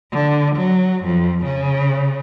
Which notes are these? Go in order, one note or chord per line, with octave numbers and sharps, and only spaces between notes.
D3
F#3
F2
C#3